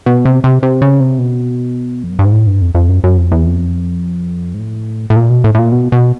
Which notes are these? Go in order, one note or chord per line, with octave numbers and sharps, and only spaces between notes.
B2
C3
C3
C3
C#3
C3
B2
F2
F#2
G2
G#2
A2
G2
F2
F2
F#2
F#2
F2
E2
F2
G#2
A2
A2
A#2
B2
A2
A2
A#2
B2
B2